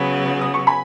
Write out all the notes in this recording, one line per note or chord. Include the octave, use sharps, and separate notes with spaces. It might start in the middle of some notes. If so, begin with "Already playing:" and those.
Already playing: C#3 F#3 B3 G#5 B5
D#6
C#6
G#5 B5